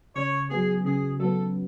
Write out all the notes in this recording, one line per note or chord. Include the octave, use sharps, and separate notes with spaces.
C#3 C#5
F#3 B3 G#4
C#3 G#4
F#3 B3 A4